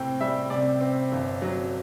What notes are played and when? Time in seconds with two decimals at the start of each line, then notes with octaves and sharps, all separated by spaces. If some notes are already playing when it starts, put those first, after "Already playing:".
Already playing: A2 C3 C4 G5
0.21 G3 E5
0.50 C3 D5
0.81 C4
1.12 G1
1.42 F#3